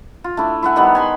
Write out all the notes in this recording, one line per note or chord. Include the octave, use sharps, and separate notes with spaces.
F4
A3 D4 E4
E4 E5 F#5 G#5
D#3 G3 B3 F#5
G#5 B5 C6